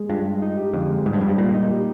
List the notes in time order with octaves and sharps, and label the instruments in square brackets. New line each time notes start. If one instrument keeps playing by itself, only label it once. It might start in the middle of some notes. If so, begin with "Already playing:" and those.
Already playing: [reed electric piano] G#3 G#4
[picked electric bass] G2 [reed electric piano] F4
[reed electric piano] G#3
D#4
G4
[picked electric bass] F2 [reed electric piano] D3
[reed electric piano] G#3
[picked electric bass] G#2 [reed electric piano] G3
[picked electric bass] G2
[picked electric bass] F2 [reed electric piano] G3
[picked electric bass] G2
[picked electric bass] A#2 [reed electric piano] D#4
[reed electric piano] D#4
G4